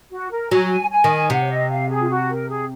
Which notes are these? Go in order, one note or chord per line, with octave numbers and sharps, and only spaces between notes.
F#4
A#4
F#3 G#5
G#5
D#3
C3 F#5
C#5
D#5
F5
G#4
F4
F#4
A#4
G#4